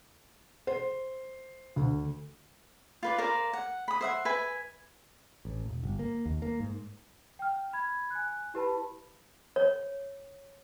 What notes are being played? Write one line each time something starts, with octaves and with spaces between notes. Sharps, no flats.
C5
D2
F4 B4 D5
A#4 C5 D5 F5
F#5
B5 D#6
C5 E5 F#5
B4 E5 G#5
A1
E1
G1
A#3
D#2
A#3
G#2
G5 F6
B5 G#6
G#5 F#6
E4 G4 B4 A5 B5
C#5